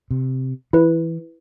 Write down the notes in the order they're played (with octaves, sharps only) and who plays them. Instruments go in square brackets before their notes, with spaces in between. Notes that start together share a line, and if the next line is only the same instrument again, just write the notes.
[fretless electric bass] C3
[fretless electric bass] E3 [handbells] E4 B4